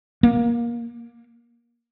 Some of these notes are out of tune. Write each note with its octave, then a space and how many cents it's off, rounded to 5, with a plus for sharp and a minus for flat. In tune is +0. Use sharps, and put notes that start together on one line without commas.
A#3 +15